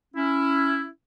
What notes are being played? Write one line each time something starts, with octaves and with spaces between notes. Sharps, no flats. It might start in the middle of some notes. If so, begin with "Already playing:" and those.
C#4 E4